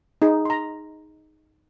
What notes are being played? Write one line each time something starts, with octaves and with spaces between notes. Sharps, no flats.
D#4 G#4
A#5 C6